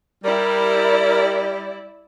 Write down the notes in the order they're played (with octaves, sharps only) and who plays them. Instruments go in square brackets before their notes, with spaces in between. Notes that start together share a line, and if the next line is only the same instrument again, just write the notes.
[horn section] G3 [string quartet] E4 D5 [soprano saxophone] A#4